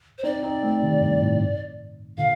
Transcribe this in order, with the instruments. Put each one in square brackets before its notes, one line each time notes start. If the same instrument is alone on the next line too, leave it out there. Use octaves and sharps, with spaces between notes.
[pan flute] C5
[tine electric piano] C4 D#4 [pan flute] D5
[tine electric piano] C4 D#4
A3 C4
C3 D#3
G2
A2
[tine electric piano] A#2 D3 [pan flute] F5